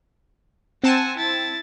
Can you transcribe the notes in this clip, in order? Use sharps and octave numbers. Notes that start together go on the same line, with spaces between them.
C4 F#5 G#5 A5 E7
E4 A6